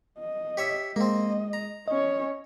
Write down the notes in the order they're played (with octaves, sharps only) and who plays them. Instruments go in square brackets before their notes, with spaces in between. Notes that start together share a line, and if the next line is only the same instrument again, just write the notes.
[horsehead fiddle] D#5
[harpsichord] G4 C#5 E5
[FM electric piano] G#3 [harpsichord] A#3 C4 [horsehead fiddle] D#5
[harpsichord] A#5
[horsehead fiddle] C#4 C#5 [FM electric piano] D#5